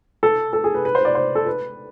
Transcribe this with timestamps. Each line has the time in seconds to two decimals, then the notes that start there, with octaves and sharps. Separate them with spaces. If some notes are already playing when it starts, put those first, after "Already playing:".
0.23 A4
0.53 A4
0.64 G#4
0.75 B4
0.85 B4
0.95 C5
1.05 D5
1.15 C5
1.35 A4
1.46 B4